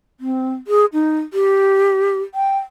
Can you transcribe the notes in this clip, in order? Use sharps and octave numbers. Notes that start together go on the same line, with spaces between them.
C4
G#4
D#4
G4
G5